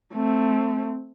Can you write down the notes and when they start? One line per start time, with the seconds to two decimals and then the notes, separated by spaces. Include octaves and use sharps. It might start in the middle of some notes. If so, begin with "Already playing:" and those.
0.14 A3 C4